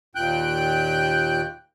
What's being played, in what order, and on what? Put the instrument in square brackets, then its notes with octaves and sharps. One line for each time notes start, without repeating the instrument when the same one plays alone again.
[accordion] D#2 A#2 G5 F#6 G6